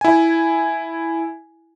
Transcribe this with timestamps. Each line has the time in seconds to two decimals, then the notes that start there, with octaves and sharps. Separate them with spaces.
0.01 E4 G#5